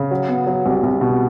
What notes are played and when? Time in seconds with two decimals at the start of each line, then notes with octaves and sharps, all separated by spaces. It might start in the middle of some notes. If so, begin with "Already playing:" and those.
Already playing: C#3
0.11 F#3
0.28 B3
0.47 F#3
0.66 C2
0.83 C2
1.01 B2